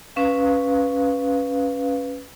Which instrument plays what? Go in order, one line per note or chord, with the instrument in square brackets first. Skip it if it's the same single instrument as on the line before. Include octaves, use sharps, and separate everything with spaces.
[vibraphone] C#4 B4 F5